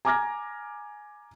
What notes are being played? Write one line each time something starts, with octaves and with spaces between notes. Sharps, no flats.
G#5 A#5 D6 F6 G#6 A#6